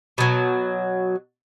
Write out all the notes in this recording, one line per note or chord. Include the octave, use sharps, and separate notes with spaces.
B2 F#3